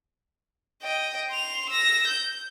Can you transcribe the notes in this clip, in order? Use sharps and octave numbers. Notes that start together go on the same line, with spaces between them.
D#5 G5
C6 F7
E6 A#6
G6